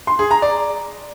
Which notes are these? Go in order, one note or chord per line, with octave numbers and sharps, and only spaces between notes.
C6
G#4
A#5
D5